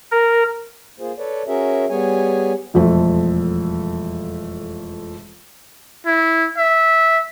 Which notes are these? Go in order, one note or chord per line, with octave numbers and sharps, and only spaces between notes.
A#4
A#3 F4 G#4 C5
A4 B4 C#5 D5
C#4 F#4 G#4 A#4 E5
G3 B3 G#4 C#5 G#5
E1 F2 F3 A3
E4
E5